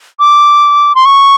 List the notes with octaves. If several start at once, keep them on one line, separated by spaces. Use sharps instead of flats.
D6
C6
C#6